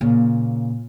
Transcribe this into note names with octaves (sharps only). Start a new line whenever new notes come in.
A#2 C#3